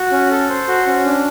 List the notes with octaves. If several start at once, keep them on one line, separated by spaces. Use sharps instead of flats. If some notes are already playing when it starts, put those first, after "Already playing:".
Already playing: F#4
C#4
A4
C5
F#4
C#4
D4